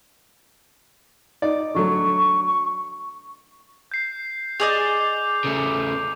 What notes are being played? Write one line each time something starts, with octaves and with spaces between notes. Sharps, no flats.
D#4 D5
D3 F#3 A3 C#6
C#6
G6 C7
G#4 D5 D#5 D6 G6 F7
C#3 A3